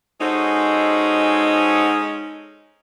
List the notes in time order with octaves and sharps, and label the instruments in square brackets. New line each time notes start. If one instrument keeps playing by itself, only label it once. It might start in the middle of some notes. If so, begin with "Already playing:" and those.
[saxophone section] G#3 C#4 D#4 [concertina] F#4 A4 C5